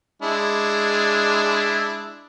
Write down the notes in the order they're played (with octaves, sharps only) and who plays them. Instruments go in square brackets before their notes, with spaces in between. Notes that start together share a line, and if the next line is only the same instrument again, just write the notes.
[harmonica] G#3 D4 E4